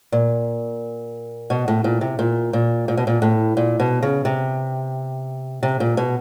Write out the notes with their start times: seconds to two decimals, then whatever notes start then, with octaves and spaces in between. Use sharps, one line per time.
0.12 A#2
1.50 B2
1.68 A2
1.84 A#2
2.01 C3
2.19 A#2
2.53 A#2
2.88 A#2
2.97 B2
3.07 A#2
3.22 A2
3.57 A#2
3.80 B2
4.02 C#3
4.25 C3
5.63 C3
5.80 A#2
5.97 B2